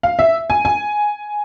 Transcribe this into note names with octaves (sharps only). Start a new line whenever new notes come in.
F5
E5
G#5
G#5